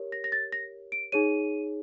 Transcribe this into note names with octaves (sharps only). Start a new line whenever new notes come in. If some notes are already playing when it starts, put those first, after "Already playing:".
Already playing: G4 A#4 C#5
A#6
A#6
A6
A#6
D7
D#4 G#4 C#5 D#7